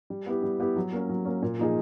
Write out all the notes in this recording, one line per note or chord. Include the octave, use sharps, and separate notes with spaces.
G3
B3 E4 G4
G3
B3 E4 G4
F#3
A#3 C#4
F#3
A#3 C#4
A#2
F3 A#3 D#4 G#4